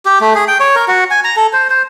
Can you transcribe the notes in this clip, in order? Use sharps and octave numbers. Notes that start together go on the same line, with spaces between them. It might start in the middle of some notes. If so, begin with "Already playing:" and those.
G4
A3
G#4
G5
C#5
A#4
F#4
G#5
A#5
A4
C5
C5